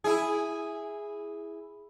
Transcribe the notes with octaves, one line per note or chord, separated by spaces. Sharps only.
E4 G#4